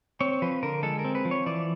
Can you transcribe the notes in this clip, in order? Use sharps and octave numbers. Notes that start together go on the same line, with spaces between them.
C4 C#5
F3 B4
D3 A#4
G#3 A4
A#4
C4
B4
F3
C#5
E3 D5